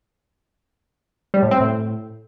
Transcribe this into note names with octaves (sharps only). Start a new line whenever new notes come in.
G3
A2
C4
A2